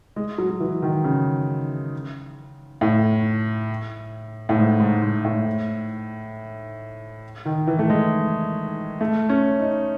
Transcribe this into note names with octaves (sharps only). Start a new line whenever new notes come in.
G#3
F#3
F#3
E3
D#3
C#3
A2
A2
G#2
G#2
G#2
A2
D#3
E3
A3
G#3
A3
C#4
D#4